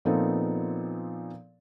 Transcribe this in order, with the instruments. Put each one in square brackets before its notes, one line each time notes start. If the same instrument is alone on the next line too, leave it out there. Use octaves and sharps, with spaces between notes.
[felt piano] A#2 F3 B3 C4 D#4 A4